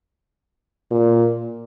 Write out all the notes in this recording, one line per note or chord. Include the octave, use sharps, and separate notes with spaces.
A#2